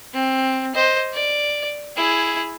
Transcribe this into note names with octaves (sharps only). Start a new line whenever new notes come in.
C4
C5 D#5
D5
E4 G#4